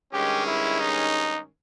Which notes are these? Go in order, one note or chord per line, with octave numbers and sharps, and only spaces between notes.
G2 D#3 G#3 C#4 G4
E4
D#4